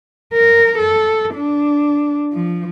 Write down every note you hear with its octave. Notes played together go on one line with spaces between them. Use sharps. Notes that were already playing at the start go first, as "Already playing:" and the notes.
A#4
A4
D4
F3